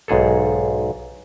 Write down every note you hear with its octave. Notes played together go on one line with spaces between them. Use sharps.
B1 G#2 G#4 A4